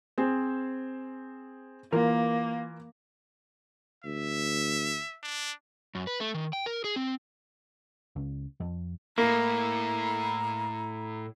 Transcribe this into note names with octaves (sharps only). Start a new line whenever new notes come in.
C4 G#4 C5
E3 A#3 F4 A#4
D2 E5
D4
F#2
B4
A3
D#3
G5
A#4
G#4
C4
C#2
F2
A2 A#3 E4 A#5